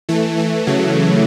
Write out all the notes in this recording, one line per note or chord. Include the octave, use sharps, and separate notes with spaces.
E3 A3
E3
C#3 F#3